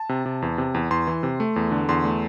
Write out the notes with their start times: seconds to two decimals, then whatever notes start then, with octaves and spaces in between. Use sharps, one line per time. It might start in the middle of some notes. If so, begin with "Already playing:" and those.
Already playing: A5
0.09 C3
0.26 C3
0.42 E2
0.58 C3
0.74 E2
0.91 E2 C6
1.07 E3
1.23 C3
1.40 A3
1.56 E2
1.72 D3
1.89 E2 C6
2.05 A3